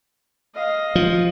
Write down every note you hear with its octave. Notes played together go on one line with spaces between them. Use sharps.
D#5 F5
F3